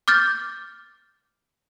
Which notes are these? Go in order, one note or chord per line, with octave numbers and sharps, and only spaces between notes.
D6 F6 G6 A6